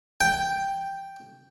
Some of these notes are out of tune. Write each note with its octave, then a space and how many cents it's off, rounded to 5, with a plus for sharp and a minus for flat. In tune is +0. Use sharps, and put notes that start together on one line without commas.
G5 +0